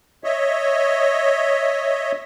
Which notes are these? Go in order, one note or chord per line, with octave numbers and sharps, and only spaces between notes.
C#5 D#5 E5